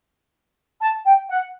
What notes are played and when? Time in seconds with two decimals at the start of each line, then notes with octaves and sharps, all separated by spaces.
0.81 A5
1.05 G5
1.29 F#5